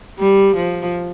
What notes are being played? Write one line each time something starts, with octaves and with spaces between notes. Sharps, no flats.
G3
F3